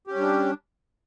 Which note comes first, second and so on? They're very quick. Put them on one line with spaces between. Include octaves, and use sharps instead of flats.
G4 C#4 G3 D4